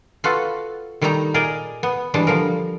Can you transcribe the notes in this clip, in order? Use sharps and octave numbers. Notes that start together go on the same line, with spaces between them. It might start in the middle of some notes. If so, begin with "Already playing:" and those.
F4 F#4 A4 B4
D#3 G3 A3 D#4 A#5
A#2 G#4 A#4 D5 D#5
B3
E3 G3 G#3 D4
D3 F3 G3 A#4